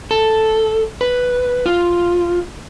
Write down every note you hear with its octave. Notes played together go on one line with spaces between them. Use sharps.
A4
B4
F4